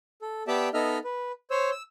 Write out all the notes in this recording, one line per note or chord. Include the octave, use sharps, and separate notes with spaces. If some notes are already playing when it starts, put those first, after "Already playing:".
A4
B3 G4 D5 E5 G5 A5
B3 D#4 A4 D#5 E5 F6
B4
C5 C#5 E6
E6